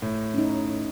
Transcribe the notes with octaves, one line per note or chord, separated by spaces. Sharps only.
A2
C#4 D#4